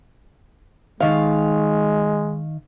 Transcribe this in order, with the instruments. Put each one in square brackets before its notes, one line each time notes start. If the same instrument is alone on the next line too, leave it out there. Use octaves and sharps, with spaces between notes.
[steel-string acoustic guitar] D#3 F5 [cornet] G#3